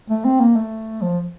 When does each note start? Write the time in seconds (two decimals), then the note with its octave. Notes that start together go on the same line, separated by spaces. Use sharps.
0.10 A3
0.25 C4
0.40 A#3
0.55 A3
1.02 F3